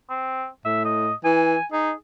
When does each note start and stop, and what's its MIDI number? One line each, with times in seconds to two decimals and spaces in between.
0.10 0.47 60
0.65 1.10 45
0.65 0.84 76
0.84 1.14 75
1.24 1.56 52
1.24 1.65 80
1.72 1.92 63
1.72 1.93 68